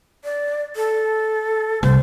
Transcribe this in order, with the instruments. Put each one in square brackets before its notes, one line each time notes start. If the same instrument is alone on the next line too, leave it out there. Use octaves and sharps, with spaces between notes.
[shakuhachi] D5
A4
[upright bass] C2 [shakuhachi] C5